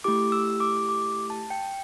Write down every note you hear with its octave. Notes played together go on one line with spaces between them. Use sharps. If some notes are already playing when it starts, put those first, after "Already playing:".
A3 E4 G4 D6
E6
D6
D6
A5
G5